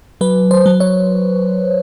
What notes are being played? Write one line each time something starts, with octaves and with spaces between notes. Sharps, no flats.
F#3 B4
C5
F#3
C#5